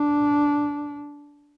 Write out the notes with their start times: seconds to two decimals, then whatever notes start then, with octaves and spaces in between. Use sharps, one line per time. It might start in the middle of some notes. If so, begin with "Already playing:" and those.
Already playing: D4